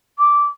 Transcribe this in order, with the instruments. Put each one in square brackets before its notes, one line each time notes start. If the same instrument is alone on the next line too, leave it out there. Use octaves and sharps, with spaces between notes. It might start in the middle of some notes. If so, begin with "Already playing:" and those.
[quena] D6